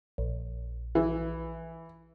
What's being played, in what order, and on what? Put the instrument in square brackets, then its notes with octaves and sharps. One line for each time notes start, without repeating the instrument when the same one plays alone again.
[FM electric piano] A#1
[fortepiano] E3